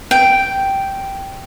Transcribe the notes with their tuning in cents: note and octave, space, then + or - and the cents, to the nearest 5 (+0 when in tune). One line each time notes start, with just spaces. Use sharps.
G5 -5